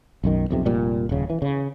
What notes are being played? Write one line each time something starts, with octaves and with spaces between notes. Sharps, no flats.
B1 F#2 D#3
B1 F2 C3
F1 A#2 G3
D#1 C#3
E3
C#3